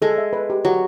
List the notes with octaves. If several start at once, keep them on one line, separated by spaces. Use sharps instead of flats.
G#3 A4
E5
B4
G4
F#3 G4